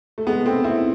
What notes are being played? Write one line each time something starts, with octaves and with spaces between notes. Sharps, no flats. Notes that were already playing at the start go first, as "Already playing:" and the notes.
A3
G#3 B3
A3 C4
C4 E4